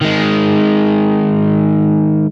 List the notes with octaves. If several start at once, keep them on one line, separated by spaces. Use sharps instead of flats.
D#3 G#3